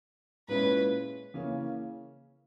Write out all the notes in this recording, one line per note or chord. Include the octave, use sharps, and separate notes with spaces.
A#2 G#3 C#4 E4 B4
C#3 E3 A#3 C#4